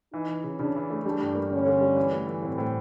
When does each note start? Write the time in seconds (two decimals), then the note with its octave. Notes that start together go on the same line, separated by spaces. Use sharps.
0.13 E3 D#4
0.29 E3
0.44 C#3
0.59 C#3 D4
0.75 E3
0.90 A3
1.05 G3 D4
1.20 G2
1.35 A#3
1.51 D3 C#4
1.66 D3
1.81 G3
1.97 E3
2.13 A3
2.27 E3
2.43 A2 C4
2.58 A2